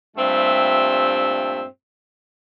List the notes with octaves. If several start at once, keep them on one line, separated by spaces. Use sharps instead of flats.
G2 A#2 G3 A3 C4 E5